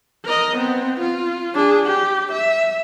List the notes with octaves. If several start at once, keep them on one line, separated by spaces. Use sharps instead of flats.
A#4 D#5
B3 C4
F4
D4 G#4
G4
E5